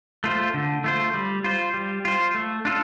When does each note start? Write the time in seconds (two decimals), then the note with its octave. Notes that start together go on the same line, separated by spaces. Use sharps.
0.24 A3 F4 C5
0.54 D3
0.84 A3 F4 C5
1.14 G3
1.44 F4 C5
1.74 G3
2.05 F4 C5
2.35 A3
2.65 D4 F4 A4